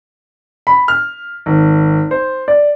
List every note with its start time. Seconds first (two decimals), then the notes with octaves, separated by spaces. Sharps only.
0.67 B5
0.88 F6
1.46 G#1
2.11 C5
2.48 D5